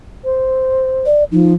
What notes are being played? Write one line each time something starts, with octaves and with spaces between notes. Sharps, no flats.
C5
D5
F3 D#4